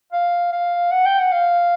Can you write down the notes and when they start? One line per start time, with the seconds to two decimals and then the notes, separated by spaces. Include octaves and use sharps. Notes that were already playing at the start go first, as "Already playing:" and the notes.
0.12 F5
0.52 F5
0.92 F#5
1.05 G5
1.19 F#5
1.32 F5